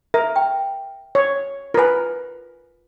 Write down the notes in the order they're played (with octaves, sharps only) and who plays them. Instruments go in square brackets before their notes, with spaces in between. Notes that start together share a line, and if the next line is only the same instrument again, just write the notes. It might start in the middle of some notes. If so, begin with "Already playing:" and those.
[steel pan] A#4 [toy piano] E5
[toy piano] G5
[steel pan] C#5
[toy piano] F4 G#5 [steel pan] A#4 B4